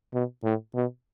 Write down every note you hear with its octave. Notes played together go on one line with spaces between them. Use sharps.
B2
A2
B2